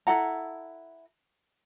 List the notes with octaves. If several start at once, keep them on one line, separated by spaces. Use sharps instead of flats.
E4 A4 F#5 A#5